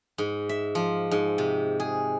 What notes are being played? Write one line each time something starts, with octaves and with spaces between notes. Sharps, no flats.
G#2
E5
F3
G#2
C3
G#4